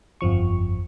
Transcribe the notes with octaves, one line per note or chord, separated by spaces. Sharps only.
G1 F2 F3 C#6